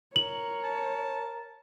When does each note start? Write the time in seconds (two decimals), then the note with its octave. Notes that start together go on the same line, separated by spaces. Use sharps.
0.16 A#4 C#5 F#7
0.64 A5